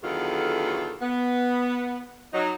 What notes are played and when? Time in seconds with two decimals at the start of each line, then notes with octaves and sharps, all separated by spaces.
0.03 E2 D3 D#3 F#3 F4 A4
1.01 B3
2.33 F#3 D#4